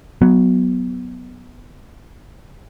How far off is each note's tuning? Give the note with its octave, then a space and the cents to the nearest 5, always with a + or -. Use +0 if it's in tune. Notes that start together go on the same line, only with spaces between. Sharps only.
F#3 +0 B3 +0